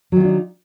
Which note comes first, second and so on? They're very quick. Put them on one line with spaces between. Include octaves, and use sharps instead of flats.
F#3 D#3 F4 D4 D#4